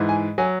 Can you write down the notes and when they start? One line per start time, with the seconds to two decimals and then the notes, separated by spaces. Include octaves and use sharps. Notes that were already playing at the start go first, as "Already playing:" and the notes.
Already playing: G#2 E3
0.09 G#5
0.38 F#3 G#5